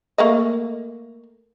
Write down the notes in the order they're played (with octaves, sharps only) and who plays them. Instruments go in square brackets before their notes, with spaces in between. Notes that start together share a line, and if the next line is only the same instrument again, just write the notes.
[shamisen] A3 A#3 D#5